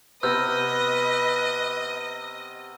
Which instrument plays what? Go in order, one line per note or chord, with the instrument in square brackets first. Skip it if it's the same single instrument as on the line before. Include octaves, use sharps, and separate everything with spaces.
[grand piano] C3 B3 [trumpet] B4 [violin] D#5 [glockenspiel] E6 F6 G6